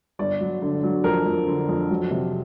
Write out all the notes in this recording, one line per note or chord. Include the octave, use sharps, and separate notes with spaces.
G1 D5
F#3
D3
F#3
F2 A#4
F2
D3
F2
F#3
C3